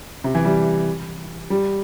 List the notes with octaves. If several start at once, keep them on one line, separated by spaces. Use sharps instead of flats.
C3
E3
G3
G3